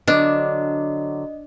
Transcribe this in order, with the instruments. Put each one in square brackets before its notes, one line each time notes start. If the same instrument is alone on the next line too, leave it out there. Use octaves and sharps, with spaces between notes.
[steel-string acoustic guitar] D3 F#3 [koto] D4 [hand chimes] D#5